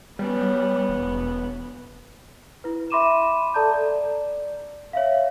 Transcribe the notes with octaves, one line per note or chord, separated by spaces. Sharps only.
F#3 G3 B3 C#4
E1
E4 B4
E5 B5 C6 D6 D#7 E7
A4 D5 A5 A#5 G6
D5
C#5 E5 F5